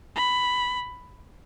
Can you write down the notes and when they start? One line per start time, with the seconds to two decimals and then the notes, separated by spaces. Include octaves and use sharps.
0.16 B5